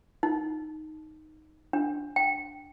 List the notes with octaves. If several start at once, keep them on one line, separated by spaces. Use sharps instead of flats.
D#4
D4
G5